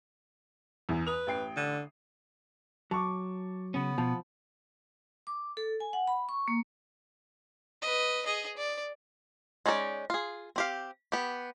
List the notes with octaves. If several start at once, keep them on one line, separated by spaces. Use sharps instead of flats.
E2 E3
B4 D#6 F7
A1 G5 C7
D3
F#3 A5 C#6 D6
C#3 B3 C#4
B2 F3 A5
D6
A4
G#5
F#5
B5
C#6
A#3
B4 D#5
G#4 D#5
D5
G#3 C#4 D#4 A4 D5
F4 G#4
C4 G4 F5
B3 G4